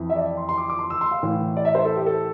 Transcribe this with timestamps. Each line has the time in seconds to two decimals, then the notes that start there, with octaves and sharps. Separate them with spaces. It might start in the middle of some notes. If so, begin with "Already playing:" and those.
Already playing: F2 E3
0.10 E5
0.16 D5
0.37 C6
0.49 C6
0.58 D6
0.70 D6
0.79 C6
0.90 E6
1.01 C6
1.11 F5
1.23 A2 E3
1.57 D5
1.65 E5
1.75 C5
1.85 A4
1.96 G4
2.06 A4